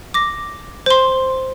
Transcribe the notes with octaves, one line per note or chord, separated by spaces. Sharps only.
D6 A#6
C5 C6